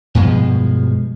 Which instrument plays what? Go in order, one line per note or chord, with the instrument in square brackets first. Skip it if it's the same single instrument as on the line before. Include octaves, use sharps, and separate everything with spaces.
[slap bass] G2 B2 F3 G#3